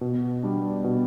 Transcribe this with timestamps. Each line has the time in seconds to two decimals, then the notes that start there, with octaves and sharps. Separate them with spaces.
0.01 B2
0.43 G3 D4
0.84 B2